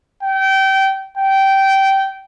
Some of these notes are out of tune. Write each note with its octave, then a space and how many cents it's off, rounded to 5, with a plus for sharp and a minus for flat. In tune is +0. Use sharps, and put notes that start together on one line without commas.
G5 -25
G5 -15